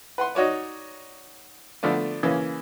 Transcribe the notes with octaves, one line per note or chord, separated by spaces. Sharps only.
B4 F#5 C6
D#4 F#4 C#5 D5
D3 F3 A3 B3 D5
C#3 E3 A#3 C#4